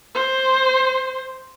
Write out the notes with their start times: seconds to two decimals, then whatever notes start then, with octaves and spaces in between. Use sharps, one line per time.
0.15 C5